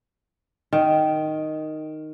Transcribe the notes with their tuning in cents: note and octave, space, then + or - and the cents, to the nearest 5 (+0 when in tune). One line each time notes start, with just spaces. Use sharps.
D#3 -5